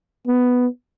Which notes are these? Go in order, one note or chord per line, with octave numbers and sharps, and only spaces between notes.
B3